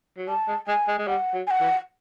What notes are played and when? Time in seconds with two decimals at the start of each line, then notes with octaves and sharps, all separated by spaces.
0.17 F#3
0.28 G3 A5
0.48 G#3
0.67 G#3 G#5
0.88 G#3
0.99 G#3
1.07 G3 F#5
1.34 F#3
1.47 G#5
1.51 F#5
1.60 E3